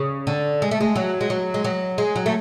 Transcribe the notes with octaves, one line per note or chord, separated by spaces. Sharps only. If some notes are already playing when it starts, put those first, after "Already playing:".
Already playing: C#3
D3
G#3
A3
G#3
F#3
G#3
F#3
G#3
F#3
G#3
F#3
A3